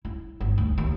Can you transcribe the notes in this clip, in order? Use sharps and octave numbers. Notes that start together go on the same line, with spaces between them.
E4
G1
D2
D#2